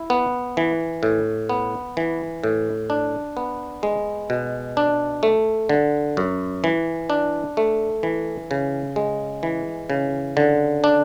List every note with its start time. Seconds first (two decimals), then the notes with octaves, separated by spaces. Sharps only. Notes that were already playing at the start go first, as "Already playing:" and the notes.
Already playing: E4
0.10 B3
0.57 E3
1.03 A2
1.49 B3
1.97 E3
2.44 A2
2.90 D4
3.37 B3
3.83 G#3
4.30 B2
4.77 D4
5.23 A3
5.69 D3
6.17 F#2
6.64 E3
7.10 D4
7.57 A3
8.03 E3
8.51 C#3
8.96 G#3
9.43 E3
9.90 C#3
10.37 D3
10.84 D4